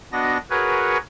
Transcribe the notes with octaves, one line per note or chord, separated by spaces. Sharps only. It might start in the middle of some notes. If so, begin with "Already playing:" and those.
B3 D4 F#4 D#5 A#6
F#4 G#4 A#4 B4 C#5